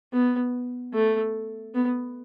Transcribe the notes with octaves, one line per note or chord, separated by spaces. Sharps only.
B3
A3
B3